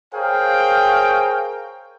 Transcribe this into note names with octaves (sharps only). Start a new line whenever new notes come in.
G#4 A#4 C5 C#5 F5 G5